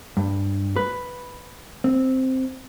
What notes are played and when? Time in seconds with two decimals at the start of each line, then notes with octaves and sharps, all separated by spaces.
0.17 G2
0.76 B4
1.84 C4